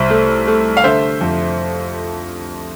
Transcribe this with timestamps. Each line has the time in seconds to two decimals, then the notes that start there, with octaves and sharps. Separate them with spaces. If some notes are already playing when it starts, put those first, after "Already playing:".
Already playing: C2 C5 E5
0.10 A3
0.47 A3
0.77 F5
0.84 D3 C5 E5
1.21 F2